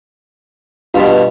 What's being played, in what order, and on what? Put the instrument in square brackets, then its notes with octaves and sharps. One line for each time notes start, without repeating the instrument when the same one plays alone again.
[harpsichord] G2 B2 [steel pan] F4